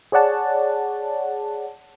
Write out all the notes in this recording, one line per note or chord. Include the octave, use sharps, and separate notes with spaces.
G#4 C#5 D5 F#5 A5